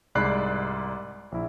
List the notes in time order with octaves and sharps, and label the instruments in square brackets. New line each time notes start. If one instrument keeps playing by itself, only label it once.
[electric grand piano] C2 G#2 D5 B5 F#6 C7
A#1 E4